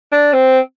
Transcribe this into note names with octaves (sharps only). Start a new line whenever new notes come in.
D4
C4